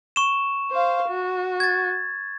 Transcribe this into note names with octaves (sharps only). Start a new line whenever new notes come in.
C#6 E7
C5 F5
F#4
G#6 A6